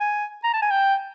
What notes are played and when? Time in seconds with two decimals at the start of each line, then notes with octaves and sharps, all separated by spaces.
0.01 G#5
0.44 A#5
0.53 A5
0.62 G#5
0.71 G5